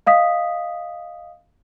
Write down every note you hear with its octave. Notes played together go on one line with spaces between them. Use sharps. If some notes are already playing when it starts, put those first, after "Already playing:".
D#5 F5 D#6 B6